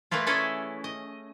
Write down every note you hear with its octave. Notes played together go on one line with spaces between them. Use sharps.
E3 A3 A#3 E4 F4
A3 C#4 E4 G#4 A4 D5
D#5